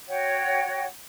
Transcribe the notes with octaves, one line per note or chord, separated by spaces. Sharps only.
F#4 C#5 F#5 G5